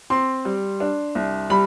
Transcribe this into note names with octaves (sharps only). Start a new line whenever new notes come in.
C4 C6
G3
D4
C2
G3 B5